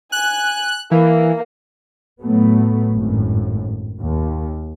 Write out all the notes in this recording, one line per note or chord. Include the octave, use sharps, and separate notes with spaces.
G#5 F#6
E3 A#3
A2 F#3 A3 B3
G#1 F#2 A2
D#2